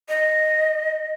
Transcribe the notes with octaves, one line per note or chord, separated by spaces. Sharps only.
D#5